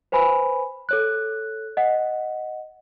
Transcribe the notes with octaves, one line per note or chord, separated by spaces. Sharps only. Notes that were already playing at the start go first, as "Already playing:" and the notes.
B4 C5 G#5 B5
A4 C#5 F#6
D#5 F#5